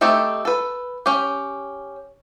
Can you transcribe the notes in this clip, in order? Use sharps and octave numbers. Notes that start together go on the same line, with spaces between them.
A3 C4 D#4 G4 A4
A4 B4
C#4 G4